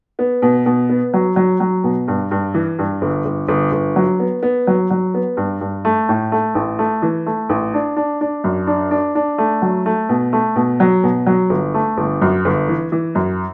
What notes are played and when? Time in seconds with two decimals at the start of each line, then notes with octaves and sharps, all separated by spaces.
0.19 B3
0.42 B2
0.66 B2
0.89 B3
1.14 F#3
1.36 F#3
1.60 F#3
1.84 B2
2.08 G2
2.31 G2
2.54 E3
2.79 G2
3.02 G1
3.25 G1
3.48 G1
3.72 G1
3.96 F#3
4.20 B3
4.43 B3
4.67 F#3
4.91 F#3
5.14 B3
5.37 G2
5.61 G2
5.85 A3
6.09 A2
6.32 A3
6.55 A1
6.79 A3
7.02 E3
7.26 A3
7.49 A1
7.74 D4
7.96 D4
8.21 D4
8.44 F#2
8.67 D4
8.91 D4
9.15 D4
9.38 A3
9.62 F#3
9.86 A3
10.09 B2
10.33 A3
10.56 B2
10.80 F#3
11.03 B2
11.27 F#3
11.50 G1
11.74 A3
11.98 G1
12.21 F#2
12.45 G1
12.68 E3
12.92 E3
13.15 F#2